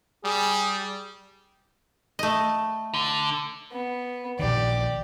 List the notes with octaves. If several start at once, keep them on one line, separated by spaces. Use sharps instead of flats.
G3 G#4
A3 D#5
D3
B3
A#1 D#3 G4 D5